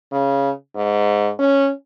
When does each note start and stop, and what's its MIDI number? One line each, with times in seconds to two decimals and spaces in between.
0.12 0.50 49
0.75 1.30 44
1.39 1.70 61